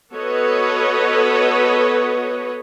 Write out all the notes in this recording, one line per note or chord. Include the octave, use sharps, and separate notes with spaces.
B3 F#4 A4 B4 C#5 D#5